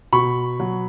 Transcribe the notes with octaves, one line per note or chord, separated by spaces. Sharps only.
B2 B5 C#6
F#3